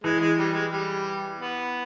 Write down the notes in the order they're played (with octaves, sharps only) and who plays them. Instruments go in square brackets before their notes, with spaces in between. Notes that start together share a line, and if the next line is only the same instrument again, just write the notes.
[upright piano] E3 [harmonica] G#3
[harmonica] G#3
G3
G#3
G3
B3